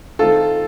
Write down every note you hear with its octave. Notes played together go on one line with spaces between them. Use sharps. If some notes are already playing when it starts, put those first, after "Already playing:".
D#3 A3 C4 F4 A4